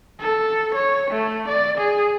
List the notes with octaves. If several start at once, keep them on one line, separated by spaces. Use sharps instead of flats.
A4
C#5
A3
D5
G#4